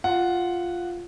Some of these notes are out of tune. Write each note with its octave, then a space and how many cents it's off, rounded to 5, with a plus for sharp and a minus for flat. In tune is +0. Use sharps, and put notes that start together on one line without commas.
F4 +0 F#5 +0